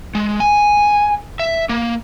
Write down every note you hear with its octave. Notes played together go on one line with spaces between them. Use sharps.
G#3
G#5
E5
A#3